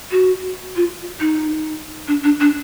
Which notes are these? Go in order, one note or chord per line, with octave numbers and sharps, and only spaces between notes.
F#4
F4
D#4
D4
D4
D4